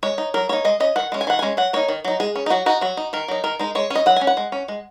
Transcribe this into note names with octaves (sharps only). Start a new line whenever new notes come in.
G#3 C#5
D#4
F#3 A#4
A#3 D#4 C#5
G#3 D#5
C#4 D#5
D#3 F#5
G#3 C#4
G#5
D#3 F#5
G#3 C#4 G#5
F#3 F#5
A#3 D#4 C#5
D#3
F#3 D#4
G#3 G#4
C#4
D#4
F#3 F#4
D#4 F#4
F#3 F#4
D#4
D#3 A#4
F#3 D#4
D#3 A#4
G#3 D#4
G#3 C#5
C#4
D#5
F#3 F#5
C#4 G#5
F#5
G#3
C#4
G#3